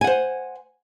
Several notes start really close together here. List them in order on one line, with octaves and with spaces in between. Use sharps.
G#5 F#5 C5